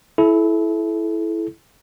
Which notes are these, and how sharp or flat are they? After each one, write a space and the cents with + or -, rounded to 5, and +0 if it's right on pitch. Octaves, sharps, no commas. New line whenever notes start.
E4 +0 A4 -35